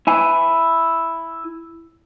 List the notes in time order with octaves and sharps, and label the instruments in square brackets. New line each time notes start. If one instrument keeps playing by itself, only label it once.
[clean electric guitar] E4 G#5